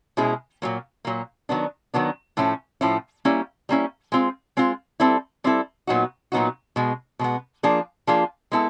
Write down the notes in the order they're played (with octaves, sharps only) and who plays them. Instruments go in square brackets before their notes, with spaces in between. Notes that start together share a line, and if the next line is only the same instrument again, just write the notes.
[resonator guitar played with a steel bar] B2 G#3 C#4 E4 G#4
A#2 F#3 A#3
A#2 F#3 A#3
D#3 F#3 B3 D4
D#3 F#3 B3 D4
A2 F3 A3 C#4 E4
A2 F3 A3 C#4 E4
G3 A#3 C#4 E4
G3 A#3 C#4 E4
G#3 C4 F4
G#3 C4 F4
G3 C4 E4 A4
G3 C4 E4 A4
A#2 F#3 B3 D#4 F#4
A#2 F#3 B3 D#4 F#4
B2 G#3 B3
B2 G#3 B3
F3 A#3 D4 F4 G#4
F3 A#3 D4 F4 G#4
G#3 B3 E4 A4